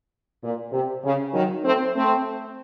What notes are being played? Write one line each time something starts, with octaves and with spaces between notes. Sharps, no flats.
A#2
C3
C#3
D#3 F#3
A3 C4
A3 C4